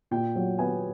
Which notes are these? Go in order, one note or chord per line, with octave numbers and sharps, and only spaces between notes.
A#2 G5
F#3
B3 G#5